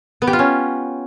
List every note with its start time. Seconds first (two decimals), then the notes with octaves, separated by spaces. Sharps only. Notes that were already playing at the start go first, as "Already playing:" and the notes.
0.22 B3
0.27 G4
0.33 F4
0.39 C#4